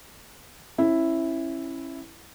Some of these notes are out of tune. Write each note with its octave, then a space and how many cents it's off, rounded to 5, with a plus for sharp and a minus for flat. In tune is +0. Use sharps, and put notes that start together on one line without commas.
C#4 -30 E4 +0